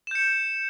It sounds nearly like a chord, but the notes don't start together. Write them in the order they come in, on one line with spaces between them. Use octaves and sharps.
E7 G6 C#7